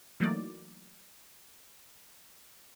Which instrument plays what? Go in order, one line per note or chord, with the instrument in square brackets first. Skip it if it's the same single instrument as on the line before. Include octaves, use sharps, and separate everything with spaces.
[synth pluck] E3 F#3 A3 A#3 D#4 D5